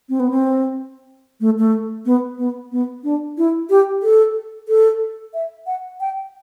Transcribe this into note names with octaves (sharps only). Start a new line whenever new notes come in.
C4
B3
C4
A3
A3
B3
B3
B3
D4
E4
G4
A4
A4
E5
F#5
G5